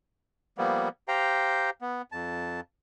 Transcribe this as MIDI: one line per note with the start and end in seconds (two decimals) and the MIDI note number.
0.58 0.89 53
0.58 0.89 55
0.58 0.89 58
0.58 0.89 59
1.08 1.70 67
1.08 1.70 72
1.08 1.70 77
1.08 1.70 79
1.08 1.70 82
1.81 2.02 59
2.12 2.60 41
2.12 2.60 81